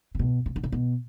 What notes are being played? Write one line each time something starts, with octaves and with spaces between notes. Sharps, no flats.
C#3
B2
C#3
D3
C#3
B2